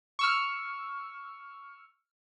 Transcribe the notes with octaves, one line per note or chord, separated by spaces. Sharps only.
C#6 E6 F6